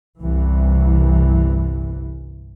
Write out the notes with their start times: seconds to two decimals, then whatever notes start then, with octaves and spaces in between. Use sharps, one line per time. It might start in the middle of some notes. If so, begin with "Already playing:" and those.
0.19 G1 C2 C3 E3